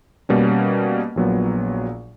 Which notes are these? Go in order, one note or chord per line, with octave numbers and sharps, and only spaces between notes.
B2 G3 A#3 C#4
A#1 A#2 F#3 B3